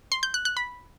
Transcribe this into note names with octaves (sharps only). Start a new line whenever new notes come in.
C6
G6
F#6
F#6
B5